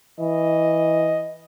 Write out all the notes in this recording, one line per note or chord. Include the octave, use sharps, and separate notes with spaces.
E3 D#5